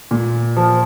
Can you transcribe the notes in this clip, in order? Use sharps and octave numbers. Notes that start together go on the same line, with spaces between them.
A#2
F3